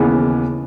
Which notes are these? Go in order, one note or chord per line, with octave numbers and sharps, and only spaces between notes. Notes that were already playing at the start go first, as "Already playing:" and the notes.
Already playing: D#2 C#3 E3 B3